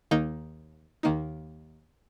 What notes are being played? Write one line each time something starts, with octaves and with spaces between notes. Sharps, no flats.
D#2 D#3 A#3 D#4
D#2 D#3 A#3 D#4